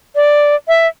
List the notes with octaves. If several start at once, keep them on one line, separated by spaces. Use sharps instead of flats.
D5
E5